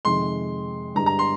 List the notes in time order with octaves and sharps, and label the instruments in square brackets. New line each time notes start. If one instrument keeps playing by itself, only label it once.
[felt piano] F2 C3 D#3 G#3 [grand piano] C6
[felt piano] G2 D3 G#3 D4 G4 [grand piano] A#5
[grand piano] A#5
C6